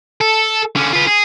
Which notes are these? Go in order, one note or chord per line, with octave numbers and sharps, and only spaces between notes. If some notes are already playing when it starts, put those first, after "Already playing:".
A4
D3 C#4
F4 B4
G#4